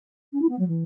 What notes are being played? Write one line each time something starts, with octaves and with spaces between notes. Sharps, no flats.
C#4
E4
B3
F#3
E3